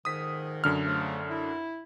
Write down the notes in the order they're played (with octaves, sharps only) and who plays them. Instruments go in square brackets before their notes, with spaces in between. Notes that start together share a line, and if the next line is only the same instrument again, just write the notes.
[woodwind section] F2 G#2 D#3 [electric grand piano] D#6 B6
[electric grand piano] F#2 D3 F6
[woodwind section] C#3 F3 A3
E4